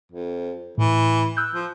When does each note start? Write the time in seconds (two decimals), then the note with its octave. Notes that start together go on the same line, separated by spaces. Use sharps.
0.11 F2
0.78 A2 E3
1.37 E6 F#6 G6
1.55 F3